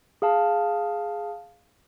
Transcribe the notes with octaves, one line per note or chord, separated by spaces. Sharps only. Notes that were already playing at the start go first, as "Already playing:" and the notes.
G#4 F5 A5